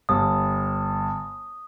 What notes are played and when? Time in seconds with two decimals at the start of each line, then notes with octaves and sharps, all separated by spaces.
0.09 G1 D#6